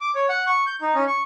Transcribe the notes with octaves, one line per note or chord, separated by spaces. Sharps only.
D6
C#5
F#5
C#6
G6
D#4
C#4
C#6